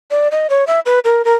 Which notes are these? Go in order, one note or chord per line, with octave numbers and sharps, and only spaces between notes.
D5
D#5
C#5
E5
B4
A#4
A#4